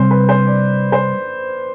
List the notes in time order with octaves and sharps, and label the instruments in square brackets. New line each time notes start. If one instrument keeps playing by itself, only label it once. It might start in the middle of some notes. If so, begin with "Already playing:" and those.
Already playing: [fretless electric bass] C3 G3 C4 [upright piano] C5
[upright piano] B4
C5
D5
C5